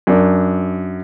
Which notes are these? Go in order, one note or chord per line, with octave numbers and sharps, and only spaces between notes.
F#2 D4